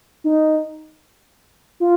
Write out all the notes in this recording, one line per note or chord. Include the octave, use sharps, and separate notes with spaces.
D#4
F4